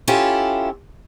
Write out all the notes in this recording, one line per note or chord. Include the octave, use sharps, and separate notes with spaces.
C#4 E4 F4 G4 A4